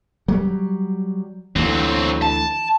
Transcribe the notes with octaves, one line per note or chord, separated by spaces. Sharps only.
F#3 G3
D2 E3 F#3 C4
A5